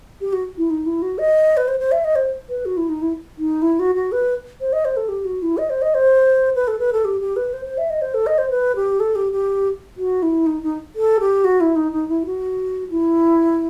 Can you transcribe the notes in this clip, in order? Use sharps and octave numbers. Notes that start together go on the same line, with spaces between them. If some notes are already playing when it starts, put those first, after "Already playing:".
G4
F#4
E4
D#4
E4
F#4
D#5
B4
C5
C5
E5
D#5
C5
B4
F#4
E4
D#4
E4
D#4
E4
F#4
F#4
B4
C5
D#5
C5
A4
G4
F#4
E4
D#5
C5
D#5
C5
B4
A4
B4
A4
G4
G4
B4
C5
C5
E5
D#5
C5
A4
D#5
C5
B4
G4
A4
G4
G4
F#4
E4
D#4
D#4
A4
G4
F#4
E4
D#4
D#4
E4
F#4
E4